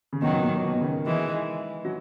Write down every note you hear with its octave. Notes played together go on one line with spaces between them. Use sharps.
C#3
B2 D#3 F#3
B2
A#2
B2
C#3
D#3
E3 G#3
F#3